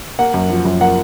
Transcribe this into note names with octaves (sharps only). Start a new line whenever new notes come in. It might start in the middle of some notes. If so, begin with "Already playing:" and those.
A#3 F#5
F#2
F3
F#2
A#3 F#5